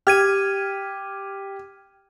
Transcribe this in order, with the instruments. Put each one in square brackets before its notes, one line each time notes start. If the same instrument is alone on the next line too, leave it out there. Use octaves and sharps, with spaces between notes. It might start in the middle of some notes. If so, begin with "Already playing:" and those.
[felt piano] G4 [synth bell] F6 G#6 D#7